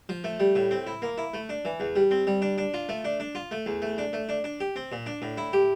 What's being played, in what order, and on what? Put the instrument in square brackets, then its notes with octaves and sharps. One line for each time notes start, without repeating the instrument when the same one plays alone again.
[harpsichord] F3
A3
G3
A2
C4
E4
A#3
E4
A3
D4
E3
E2
G3
C4
G3
D4
D4
F4
A3
D4
D4
F4
A3
E2
A3
D4
A3
D4
D4
G4
C4
A#2
D4
A2
E4
G4